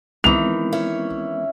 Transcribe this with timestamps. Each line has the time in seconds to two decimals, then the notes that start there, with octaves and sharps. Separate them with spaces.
0.24 D#3 E3 G#3 B3 C4 F7
0.72 C#4 E4 C#5